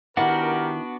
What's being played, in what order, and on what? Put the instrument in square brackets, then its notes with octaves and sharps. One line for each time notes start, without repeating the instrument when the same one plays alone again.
[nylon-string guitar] D#3 E4 [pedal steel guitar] B3 D4 F#4 [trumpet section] G4 A#4 [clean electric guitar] F#5